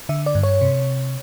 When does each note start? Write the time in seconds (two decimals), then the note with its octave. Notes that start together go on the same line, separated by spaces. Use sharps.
0.09 D3 E5
0.26 D5
0.35 G2
0.43 C#5
0.61 C3